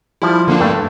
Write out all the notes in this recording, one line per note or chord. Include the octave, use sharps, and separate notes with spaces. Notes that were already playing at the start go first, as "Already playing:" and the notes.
F3 G3 E4
D3 A#3 D4
G2 A3